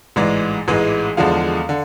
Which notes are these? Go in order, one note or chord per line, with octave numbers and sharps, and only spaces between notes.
A1 G#2 E3 G#3 D5
A1 G#2 E3 G#3
E2 D3 F3 G#3 F5
D3